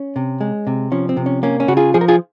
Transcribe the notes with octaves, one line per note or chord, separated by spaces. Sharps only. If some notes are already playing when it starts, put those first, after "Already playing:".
Already playing: C#4
C3
G#3
C3
F3 C#4
C4
C3
C#4
A#3 C#4
C#4
C#3 F#4
F4 G#4
F3 G#4
A#4
F4 G#4